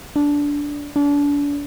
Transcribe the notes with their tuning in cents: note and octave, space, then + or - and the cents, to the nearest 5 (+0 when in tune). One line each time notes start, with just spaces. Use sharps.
D4 -15
D4 -35